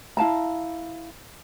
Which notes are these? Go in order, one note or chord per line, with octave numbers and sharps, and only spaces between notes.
E4 F5 A5 A#5